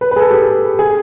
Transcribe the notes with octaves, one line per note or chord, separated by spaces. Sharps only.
B4
B4
G#4
A4
G4
G#4